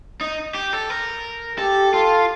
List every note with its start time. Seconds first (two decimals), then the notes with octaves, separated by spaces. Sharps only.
0.21 D#4
0.55 G4
0.73 A4
0.90 A#4
1.59 G4 A4
1.93 F4 A4